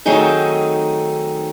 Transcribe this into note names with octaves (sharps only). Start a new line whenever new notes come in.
D#3 F#3 A3 C4 D#4 G#4